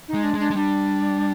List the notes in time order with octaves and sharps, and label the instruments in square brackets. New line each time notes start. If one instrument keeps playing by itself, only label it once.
[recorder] D#4
[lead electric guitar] G#3
[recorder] D4
[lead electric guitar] G#3
[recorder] D4
[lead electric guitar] G#3
[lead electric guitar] G3 [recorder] D4